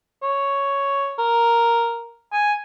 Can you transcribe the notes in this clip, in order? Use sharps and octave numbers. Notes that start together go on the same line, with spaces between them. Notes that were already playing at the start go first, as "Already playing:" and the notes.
C#5
A#4
G#5